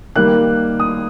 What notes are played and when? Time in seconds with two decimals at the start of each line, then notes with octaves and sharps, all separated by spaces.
0.16 D#3 G3 A#3 F#6
0.80 D#6